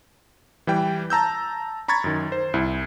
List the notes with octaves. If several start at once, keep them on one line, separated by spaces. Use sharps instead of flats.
E3 G3 G5
A5 A#5 E6 G6
A#5 B5 C#6 G#6 A6
F#2 D#3
C5
C2 E4